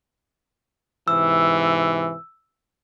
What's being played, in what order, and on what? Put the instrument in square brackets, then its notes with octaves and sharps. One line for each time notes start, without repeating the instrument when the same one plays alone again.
[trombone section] G#2 C3 E3 [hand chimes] E6